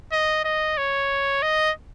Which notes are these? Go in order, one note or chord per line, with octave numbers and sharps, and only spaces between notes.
D#5
D#5
C#5
D#5